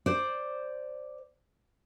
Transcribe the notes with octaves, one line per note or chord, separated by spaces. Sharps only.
C5 D5